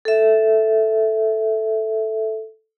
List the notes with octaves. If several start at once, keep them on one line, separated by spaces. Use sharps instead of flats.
A4 E5